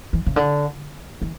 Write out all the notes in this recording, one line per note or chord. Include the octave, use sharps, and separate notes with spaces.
E3
C#3
D3
E3